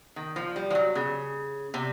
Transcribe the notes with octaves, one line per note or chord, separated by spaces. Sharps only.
D#3
F3
G3
F3
F#3
C#3
C3